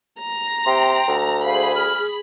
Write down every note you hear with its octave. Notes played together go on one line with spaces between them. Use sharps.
A#5
C3 G5 C6
D2
G#4 C5 F5 B5
F6